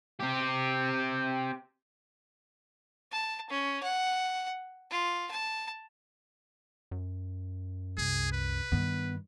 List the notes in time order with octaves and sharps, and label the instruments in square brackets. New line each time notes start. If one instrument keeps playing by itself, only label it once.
[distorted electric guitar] C4 G4
[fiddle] A5
C#4
F#5
F4
A5
[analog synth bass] F#2
[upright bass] C2 [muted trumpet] G#4
[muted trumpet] B4
[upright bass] G2 D#3 [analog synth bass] B3